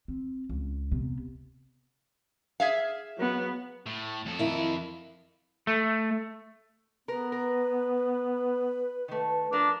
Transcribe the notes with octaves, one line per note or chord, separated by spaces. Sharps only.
C4
C#2
C3 B3
G#4 E5 F5
F#3 B3
A2
F2 A4
D#3 E4
A3
B3 A#4 B4
A#4
D#3 A3
F3 D4 A#4